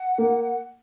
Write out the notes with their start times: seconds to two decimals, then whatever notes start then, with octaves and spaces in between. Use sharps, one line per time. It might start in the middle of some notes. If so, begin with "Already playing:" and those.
Already playing: F#5
0.18 A#3